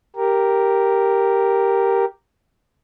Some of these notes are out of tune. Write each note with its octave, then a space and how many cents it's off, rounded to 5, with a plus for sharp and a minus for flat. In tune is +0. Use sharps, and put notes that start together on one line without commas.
G4 +0 A#4 +0